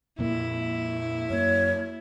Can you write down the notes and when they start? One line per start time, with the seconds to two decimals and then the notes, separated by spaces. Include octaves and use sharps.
0.19 F2 A#2 A#3 E4
1.30 F#2 A#3 C#5